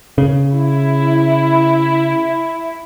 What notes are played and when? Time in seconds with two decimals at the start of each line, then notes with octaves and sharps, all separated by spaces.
0.18 C#3
0.54 E4